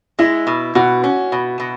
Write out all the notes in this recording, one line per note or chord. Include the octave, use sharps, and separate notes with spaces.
G#3 E4
B2
B2 F#4
C#4
B2
B2